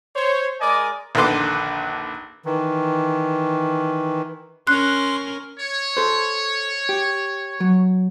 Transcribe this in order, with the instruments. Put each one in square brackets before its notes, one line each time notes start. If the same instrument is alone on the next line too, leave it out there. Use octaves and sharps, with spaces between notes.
[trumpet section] C5 C#5
G#3 A#4 D5 D#5 G#5 D6
[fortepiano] A#1 D#2 D3 B4 C6 D6
[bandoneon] D#3 E3
[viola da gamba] C#4 A#4 [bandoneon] C6 [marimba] F#6
[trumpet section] C#5
[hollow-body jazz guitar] A4 C5
G4
F#3